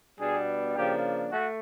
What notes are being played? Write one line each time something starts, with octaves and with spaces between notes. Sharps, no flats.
B2 G3 B3 D4 G#4
C#3 F3 A#3 D4 G4
A3 F#4